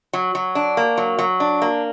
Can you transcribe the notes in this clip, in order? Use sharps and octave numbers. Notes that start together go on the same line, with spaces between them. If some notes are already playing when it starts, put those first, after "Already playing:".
F#3
F#3
D4
A#3
F#3
F#3
D4
A#3